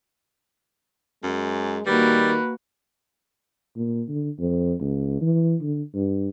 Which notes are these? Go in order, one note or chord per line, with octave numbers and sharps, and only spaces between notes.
F#2 G#3
D#3 G3 A#3 F#4 B4
A#2
D3
F2
C#2
E3
D3
G2